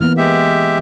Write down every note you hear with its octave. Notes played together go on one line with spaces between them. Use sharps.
E3 A#3 B3 F6
G#3 G4 E5